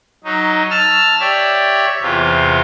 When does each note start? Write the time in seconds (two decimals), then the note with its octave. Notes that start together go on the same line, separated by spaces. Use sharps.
0.24 F#3 D#4
0.70 A5 E6 F6
1.20 G4 C#5 D5 E5
2.02 E2 C3 F4